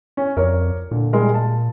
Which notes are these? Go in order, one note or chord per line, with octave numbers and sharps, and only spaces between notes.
C#4
F2 A#4 C#5 D5
A#2 D3
G3 G#3 A#4
A5